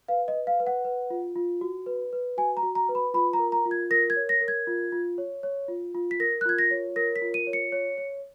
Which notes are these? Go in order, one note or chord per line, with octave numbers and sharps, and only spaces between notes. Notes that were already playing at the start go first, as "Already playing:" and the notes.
B4 F5
D#5
B4
F5
B4
F#5
B4
F4
F4
F#4
B4
B4
F#4 G#5
A#5
F#4
A#5
B4
B5
F4 B5
A#5
A#4
A#5
F4
G#6
A#4 A#6
G#6
C#5
A#6
A#4
G#6
F4
F4
C#5
C#5
F4
F4
B6
A#4 A#6
F#6
F4 G#6
A#6
C#5
A#4 A#6
B6
F4
D#7
C#5
C#7
C#5
C#5